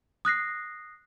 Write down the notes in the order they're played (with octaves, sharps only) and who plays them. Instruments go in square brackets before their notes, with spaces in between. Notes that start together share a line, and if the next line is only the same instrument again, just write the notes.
[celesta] D#6 F#6 A#6 C7